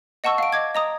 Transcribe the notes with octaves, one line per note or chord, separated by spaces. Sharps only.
D#5 F#5 A5 C#6 E6
F5 D7
D#5 D6 G#6
D#5 A#5 D#6